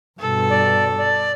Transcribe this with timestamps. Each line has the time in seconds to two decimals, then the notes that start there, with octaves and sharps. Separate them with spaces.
0.20 G2 B2 A4
0.49 D5
0.97 D5